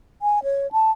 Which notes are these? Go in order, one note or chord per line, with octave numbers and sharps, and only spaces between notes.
G#5
C#5
A5